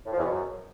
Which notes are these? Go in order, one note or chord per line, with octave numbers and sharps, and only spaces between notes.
A2
F3
E2
B2
F#2